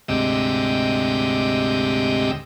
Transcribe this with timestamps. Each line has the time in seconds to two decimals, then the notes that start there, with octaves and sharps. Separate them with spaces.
0.08 D2 G#2 C3 G4 D#5 E6